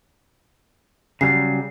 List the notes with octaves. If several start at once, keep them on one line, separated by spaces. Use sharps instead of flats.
C#3 F#3 G3 C7